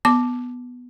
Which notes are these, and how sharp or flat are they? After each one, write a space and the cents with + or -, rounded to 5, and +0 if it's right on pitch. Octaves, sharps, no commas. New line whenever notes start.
B3 +0 D6 +0